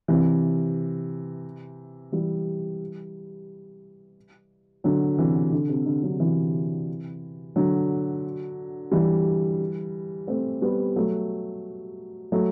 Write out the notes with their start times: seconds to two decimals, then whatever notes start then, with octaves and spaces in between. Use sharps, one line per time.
0.08 C3 E3
2.12 E3 G3
4.84 D3 F#3
5.18 C3 E3
5.52 D3
5.69 C3
5.86 D3
6.03 D3 F#3
6.20 C3 E3
7.56 D3 F#3
8.91 E3 G3
10.28 A3 C4
10.62 G3 B3
10.96 F#3 A3
12.32 F#3 A3